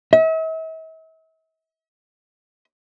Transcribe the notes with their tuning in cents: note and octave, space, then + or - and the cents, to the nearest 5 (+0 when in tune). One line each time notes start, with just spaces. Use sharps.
E5 -45